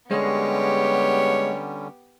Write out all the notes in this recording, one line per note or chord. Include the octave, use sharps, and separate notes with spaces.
D3 G3 G#3 B3 C#4 G4 C#5